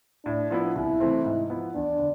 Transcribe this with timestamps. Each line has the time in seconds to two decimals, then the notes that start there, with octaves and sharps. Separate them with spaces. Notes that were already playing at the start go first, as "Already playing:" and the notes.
0.25 A2 D4
0.50 F3 B3 E4
0.75 C2 E4
1.00 C3 E3 A3 C4
1.25 G#2
1.50 F3 B3 E4
1.75 E2 D4
1.99 D3